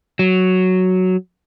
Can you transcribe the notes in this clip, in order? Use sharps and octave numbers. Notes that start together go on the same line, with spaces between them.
F#3